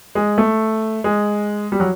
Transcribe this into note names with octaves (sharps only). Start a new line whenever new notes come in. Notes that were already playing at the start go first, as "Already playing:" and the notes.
G#3
A3
G#3
G3
F#3